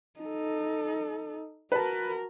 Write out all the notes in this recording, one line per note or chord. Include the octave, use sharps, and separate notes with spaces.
D#4 A4
F#4 A#4 B4 A5